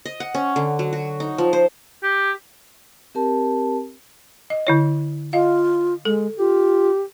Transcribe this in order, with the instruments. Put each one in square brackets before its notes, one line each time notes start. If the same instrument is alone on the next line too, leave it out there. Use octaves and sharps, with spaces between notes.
[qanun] D#5
F#5
C#4
D3
F#3
F#4
D#4
F3
C5
[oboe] G4
[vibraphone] C4 G4 A#4 A5
[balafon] D#5
D3 E4 C#5
[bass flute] F4 [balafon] D#5 F5
[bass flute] G#3 [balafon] A4
[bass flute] F4 [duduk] G4